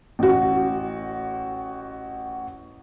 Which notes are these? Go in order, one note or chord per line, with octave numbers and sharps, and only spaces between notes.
A1 F#4